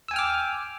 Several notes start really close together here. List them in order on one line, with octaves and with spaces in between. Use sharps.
E6 G#5 G5 F6 D6